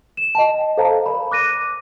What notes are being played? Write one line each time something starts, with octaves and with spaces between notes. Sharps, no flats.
E7
D#5 G5 A5
A4 C5 F5 A5 A#5
A#4 D5 B5
D6 F#6 A#6 D#7